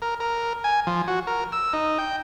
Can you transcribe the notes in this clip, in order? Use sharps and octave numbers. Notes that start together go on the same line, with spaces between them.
A#4
A#4
G#5
F3
F#4
A#4
E6
D#4
G5